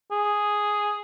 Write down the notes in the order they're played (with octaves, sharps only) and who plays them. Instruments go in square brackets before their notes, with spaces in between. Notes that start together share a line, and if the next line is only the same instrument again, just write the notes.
[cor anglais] G#4